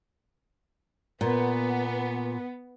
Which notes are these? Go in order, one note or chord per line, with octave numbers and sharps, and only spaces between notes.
A#2 B3